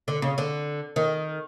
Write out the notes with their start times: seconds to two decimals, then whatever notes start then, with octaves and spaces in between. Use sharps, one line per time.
0.08 D3
0.22 C#3
0.38 D3
0.96 D#3